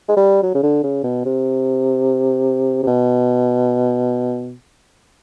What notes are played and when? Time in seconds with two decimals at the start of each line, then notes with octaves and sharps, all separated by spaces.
0.08 G#3
0.17 G3
0.43 F#3
0.55 C#3
0.63 D3
0.83 C#3
1.04 B2
1.25 C3
2.83 C3
2.87 B2